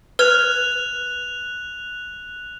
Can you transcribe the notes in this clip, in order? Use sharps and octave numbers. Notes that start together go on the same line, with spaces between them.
B4 F6 F#6 G#6 F7